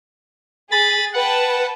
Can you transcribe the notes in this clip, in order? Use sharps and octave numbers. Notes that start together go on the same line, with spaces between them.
G#4 B5 A6
B4 F#5 G5 A5